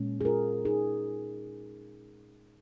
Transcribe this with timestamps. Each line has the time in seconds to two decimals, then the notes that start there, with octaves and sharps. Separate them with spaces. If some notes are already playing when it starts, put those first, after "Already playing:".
Already playing: A#2 G#3 C#4
0.21 G#4
0.25 F4 A#4
0.65 D#4 G#4